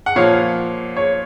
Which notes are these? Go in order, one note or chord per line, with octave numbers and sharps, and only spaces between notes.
F#5
A#2 F3 C#5 F5
C#5